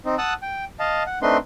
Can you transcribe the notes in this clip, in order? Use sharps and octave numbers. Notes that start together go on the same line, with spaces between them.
C4 D#4
F#5 A5 D#6 E6 F#6
G5
D#5 F5 A5
F#5
A3 C4 D4 D#4 B4 C6